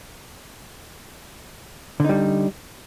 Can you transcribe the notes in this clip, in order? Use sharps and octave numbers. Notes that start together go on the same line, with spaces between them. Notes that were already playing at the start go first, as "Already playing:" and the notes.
D3 G3 D#4